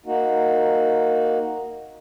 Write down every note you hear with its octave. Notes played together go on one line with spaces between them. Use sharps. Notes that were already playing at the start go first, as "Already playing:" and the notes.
A#3 D#4 F#4